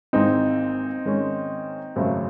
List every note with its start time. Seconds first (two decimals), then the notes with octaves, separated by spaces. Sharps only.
0.13 G#1 G#2 E3 G#3 C4 D#4
1.05 G#2 D#3 G#3 C#4
1.96 G#1 F#2 C#3 F#3 A3